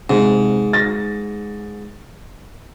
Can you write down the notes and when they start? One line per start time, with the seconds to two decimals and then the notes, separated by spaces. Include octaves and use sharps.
0.10 G#2 C3
0.73 A6 A#6